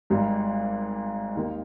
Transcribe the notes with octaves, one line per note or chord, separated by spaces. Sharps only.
G#1 G#2 G3
D#2 D#3 A#3